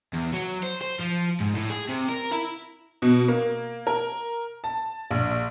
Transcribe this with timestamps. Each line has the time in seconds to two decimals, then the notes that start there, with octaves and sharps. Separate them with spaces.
0.13 E2
0.33 F#3
0.63 C5
0.81 C5
0.99 F3
1.40 G#2
1.54 A2
1.70 G#4
1.89 C3
2.09 A#4
2.32 E4
3.02 B2
3.28 A#3
3.87 A#4
4.64 A5
5.11 A#1